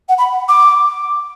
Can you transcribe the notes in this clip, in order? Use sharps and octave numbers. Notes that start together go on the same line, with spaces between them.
F#5
B5
D6